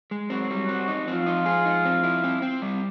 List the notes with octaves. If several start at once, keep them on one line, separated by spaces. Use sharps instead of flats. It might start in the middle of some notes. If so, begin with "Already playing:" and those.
G#3
F#3 C4 F#4
G3
C4
D#4
F3 C4 F4
D#4
G#4
D#4
C4
E4
C4
C4
G3